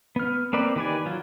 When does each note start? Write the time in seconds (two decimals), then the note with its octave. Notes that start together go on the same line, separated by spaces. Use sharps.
0.16 B3 F6
0.53 A#3 C4 B4 D5
0.76 D#3 G4 B4 D5 G#5
1.06 F#3 F4